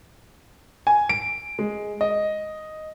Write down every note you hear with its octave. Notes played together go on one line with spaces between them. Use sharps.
G#5
D7
G#3
D#5